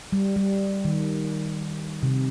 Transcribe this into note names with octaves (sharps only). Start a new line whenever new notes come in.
G3
G3
D#3
C3